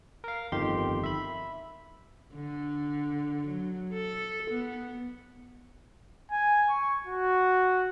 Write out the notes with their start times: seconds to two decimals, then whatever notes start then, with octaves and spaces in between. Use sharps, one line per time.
0.24 A#4 F5
0.52 G1 F2 D#3 G4 C6
1.04 E5 B5
2.34 D3
3.47 F#3
3.93 A4
4.51 B3
6.32 G#5
6.70 C#6
7.07 F#4